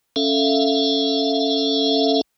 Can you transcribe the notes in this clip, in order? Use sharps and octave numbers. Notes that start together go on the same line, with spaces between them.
C#4 A4 E5 F5